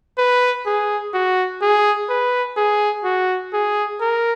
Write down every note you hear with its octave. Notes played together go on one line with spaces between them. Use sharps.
B4
G#4
F#4
G#4
B4
G#4
F#4
G#4
A#4